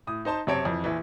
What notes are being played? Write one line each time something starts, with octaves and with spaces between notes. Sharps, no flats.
A2 D#6
D#4 C5 A5 C6
F#2 C3 C4 C#5 A5 D7
F2 E3
A#1 E3